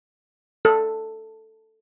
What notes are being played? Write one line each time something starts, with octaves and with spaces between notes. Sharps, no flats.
A4